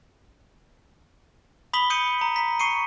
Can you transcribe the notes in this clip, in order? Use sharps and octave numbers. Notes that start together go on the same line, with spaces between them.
B5 D#6 B6 F#7 G7
D#6 G6 C#7 D#7
A#5
A#5 B6
C#6 C7 C#7 D#7